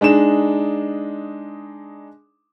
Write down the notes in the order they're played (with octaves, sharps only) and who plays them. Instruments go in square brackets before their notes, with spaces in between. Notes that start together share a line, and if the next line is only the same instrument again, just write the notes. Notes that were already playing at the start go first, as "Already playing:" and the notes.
[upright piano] G#3 D4 D#4 E7